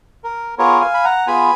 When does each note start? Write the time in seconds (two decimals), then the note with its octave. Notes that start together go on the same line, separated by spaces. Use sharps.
0.24 A#4
0.58 B3 F4 G#4 A#4 C#5
0.81 F5 G#5
0.94 B5
1.04 F#5 A#5
1.27 B3 F4 G#4 G#5 B5